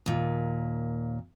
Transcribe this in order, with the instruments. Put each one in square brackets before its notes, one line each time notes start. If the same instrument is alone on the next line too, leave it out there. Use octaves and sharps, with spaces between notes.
[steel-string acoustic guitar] D#2 A#2